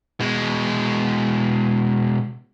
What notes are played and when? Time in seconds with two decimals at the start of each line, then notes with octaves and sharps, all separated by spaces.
0.20 B2 G#3